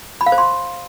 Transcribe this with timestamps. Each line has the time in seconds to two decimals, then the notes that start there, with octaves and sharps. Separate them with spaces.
0.21 B5
0.26 F5
0.32 C5
0.38 C6